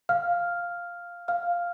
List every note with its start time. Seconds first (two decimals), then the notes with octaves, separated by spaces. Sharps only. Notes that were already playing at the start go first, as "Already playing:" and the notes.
0.09 F5 F6
1.28 F5 F6